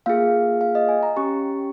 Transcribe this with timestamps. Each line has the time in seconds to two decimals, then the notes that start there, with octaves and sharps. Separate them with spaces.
0.06 A#3 F4 G#4 F5
0.61 F5
0.75 D#5
0.89 G#5
1.03 A#5
1.16 C#4 G4 C#6